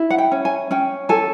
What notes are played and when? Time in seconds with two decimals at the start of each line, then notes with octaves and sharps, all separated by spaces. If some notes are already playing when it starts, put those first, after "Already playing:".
Already playing: E4
0.10 F#5
0.18 G5
0.32 C#4
0.45 G#5
0.71 C#4 G5
1.09 A4 G#5